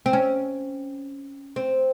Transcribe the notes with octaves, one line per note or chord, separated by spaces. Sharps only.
C4
C#4
C4